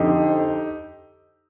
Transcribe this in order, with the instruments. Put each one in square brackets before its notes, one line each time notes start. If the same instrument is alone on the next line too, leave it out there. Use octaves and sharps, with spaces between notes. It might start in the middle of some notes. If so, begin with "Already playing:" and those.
Already playing: [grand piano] F2 D3 D#4 G4